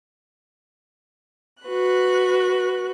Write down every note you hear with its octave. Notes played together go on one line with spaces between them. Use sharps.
F#4 B4 F#6